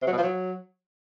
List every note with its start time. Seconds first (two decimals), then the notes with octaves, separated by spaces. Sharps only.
0.02 C3
0.07 F#3
0.12 B2
0.18 F3
0.23 F#3